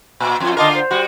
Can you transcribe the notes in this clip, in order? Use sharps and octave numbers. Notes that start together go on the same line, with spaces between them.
A#2
F2 F4
D3 F4 A#4 D#5 A5 D6
C5
G3 F#4